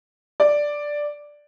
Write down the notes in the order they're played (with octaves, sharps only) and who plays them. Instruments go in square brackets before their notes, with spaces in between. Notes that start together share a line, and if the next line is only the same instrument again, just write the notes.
[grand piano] D5